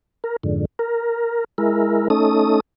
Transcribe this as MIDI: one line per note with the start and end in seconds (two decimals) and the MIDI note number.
0.24 0.36 70
0.43 0.65 41
0.43 0.65 44
0.43 0.65 50
0.79 1.44 70
1.58 2.08 56
1.58 2.08 64
1.58 2.08 70
2.10 2.60 57
2.10 2.60 61
2.10 2.60 63
2.10 2.60 69
2.10 2.60 87